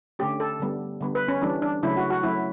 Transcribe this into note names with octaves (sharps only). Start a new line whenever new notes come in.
D3 A3 C#4 G4
A4
D3 G3 B3
D3 G3 B3
B4
C#4
E3 G3 C#4 D4
D4
C#3 F#3 A3 C#4 E4
F#4
F#4
F#3 A3 C#4 E4